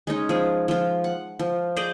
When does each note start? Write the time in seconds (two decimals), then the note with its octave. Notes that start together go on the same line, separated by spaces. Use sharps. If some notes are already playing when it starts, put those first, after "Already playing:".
0.07 G#3 C#4 D#4
0.29 F3 G#4
0.68 F3 F4
1.04 F#5
1.39 F3
1.76 G#4 C5 D5 D#5